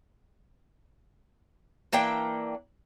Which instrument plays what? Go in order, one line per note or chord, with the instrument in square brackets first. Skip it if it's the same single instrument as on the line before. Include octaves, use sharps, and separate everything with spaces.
[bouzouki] E3 A#3 D4 G5